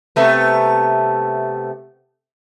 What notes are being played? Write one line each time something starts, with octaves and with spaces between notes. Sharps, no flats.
C3 A3 B3